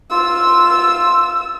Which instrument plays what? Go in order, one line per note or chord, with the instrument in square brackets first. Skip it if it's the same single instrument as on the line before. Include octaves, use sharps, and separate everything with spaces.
[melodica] F4 [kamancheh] E6